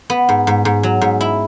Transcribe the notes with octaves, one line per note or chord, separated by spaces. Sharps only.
B3
G#2
G#2
G#2
F#3
G#2
E4